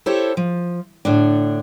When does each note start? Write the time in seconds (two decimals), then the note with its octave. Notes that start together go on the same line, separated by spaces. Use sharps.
0.06 E4 G4 A4 C5 C#5
0.37 F3
1.05 A2 D3 D4